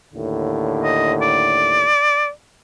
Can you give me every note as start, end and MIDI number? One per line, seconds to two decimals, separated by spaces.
0.12 1.89 39
0.12 1.89 45
0.12 1.89 50
0.83 1.13 75
1.21 2.30 74